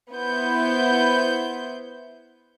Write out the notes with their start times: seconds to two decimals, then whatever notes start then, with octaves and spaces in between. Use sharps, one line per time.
0.12 B3 E4 C5 G6